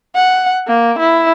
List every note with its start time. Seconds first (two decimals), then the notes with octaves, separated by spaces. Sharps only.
0.15 F#5
0.67 A#3
0.99 E4